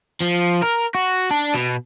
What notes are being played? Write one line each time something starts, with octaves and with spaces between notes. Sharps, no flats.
F3
A#4
F#4
D4
B2